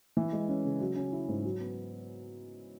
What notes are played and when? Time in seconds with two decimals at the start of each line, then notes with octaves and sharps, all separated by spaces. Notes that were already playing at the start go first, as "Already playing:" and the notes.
0.17 E3
0.33 G#3
0.49 C#4
0.64 C#3
0.81 F#3
0.96 C#4
1.13 E4
1.28 G#2
1.44 F#3
1.60 B3